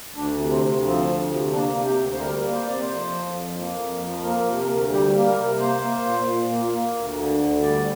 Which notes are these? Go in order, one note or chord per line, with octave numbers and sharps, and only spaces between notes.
D2 D4
C3
C4
D2
F3 C4
D2
C3
A#3 D4
C3
G4
D2
C5
G3 A#4
A#3
C5
C3 D5
C5
F2
F3
F2
A#3
F2
F3
A#3 A#4
C3
A#4
D2
G3 G4
A#3
A#4
C3
A#3 C5
A#3
A#2
A#2
A#3
A#3
D2
D3
D2
G3 D5